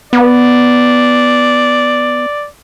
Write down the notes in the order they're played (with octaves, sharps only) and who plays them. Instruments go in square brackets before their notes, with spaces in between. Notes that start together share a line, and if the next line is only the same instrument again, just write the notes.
[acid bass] B3 [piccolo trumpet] D5